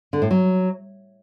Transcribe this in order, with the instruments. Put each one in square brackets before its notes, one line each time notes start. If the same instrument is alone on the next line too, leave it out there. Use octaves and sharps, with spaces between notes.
[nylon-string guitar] D3
A2
F#3